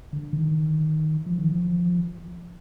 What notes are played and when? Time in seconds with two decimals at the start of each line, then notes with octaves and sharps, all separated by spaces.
0.13 D3
0.33 D#3
1.26 F3
1.38 D#3
1.52 F3